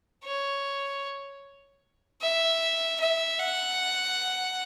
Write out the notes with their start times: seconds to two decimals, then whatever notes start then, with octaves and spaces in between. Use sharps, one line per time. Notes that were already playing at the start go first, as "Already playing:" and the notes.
0.24 C#5
2.21 E5
3.00 E5
3.39 F#5